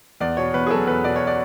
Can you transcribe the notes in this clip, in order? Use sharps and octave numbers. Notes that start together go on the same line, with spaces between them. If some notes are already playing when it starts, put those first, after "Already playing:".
E2 D5
B2 C#5
E2 B4
G#4
F#3 A4
E2 B4
B2 D5
C#5
D5